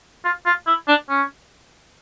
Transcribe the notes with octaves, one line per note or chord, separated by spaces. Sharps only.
F4
F4
E4
D4
C#4